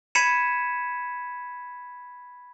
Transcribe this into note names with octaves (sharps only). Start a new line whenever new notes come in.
B5 G#6 B6 C#7 D#7 E7